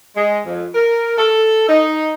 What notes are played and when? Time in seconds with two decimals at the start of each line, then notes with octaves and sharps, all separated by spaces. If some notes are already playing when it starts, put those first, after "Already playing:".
0.16 G#3
0.45 F2
0.75 A#4
1.18 A4
1.68 D#4